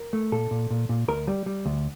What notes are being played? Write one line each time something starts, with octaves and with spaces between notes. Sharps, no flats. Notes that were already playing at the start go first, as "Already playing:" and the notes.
Already playing: A#4
A3
A#2 A4
A#2
A#2
A#2
D2 A#4
G3
G3
D2